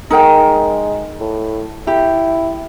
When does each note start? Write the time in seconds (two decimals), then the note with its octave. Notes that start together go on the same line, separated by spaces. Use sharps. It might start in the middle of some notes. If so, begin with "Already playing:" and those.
0.11 G#3 D#4 A#4 G5
1.20 A2
1.87 E4 G4